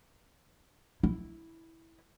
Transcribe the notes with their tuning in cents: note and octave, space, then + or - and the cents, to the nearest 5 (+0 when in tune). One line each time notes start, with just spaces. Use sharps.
E4 -10